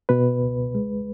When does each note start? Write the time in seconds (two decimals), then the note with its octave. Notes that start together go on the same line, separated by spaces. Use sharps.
0.09 B2 B4
0.42 C#2
0.75 G#3